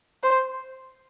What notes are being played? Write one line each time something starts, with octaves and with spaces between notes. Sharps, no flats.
C5